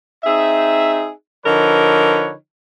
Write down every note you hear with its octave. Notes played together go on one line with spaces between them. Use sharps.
C4 D#4 G#4 E5
D3 F3 D#4 A#4 B4 C#5